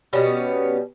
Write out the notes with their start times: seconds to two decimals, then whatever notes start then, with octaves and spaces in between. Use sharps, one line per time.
0.13 B2 G3 B3 C#4